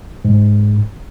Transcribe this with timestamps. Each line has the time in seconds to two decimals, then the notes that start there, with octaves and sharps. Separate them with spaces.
0.25 G#2